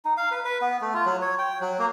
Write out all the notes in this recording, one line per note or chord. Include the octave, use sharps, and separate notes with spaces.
D#4
F5
B4
B4
B3
A3
F4
F#3
C#5
G5
F#3
A#3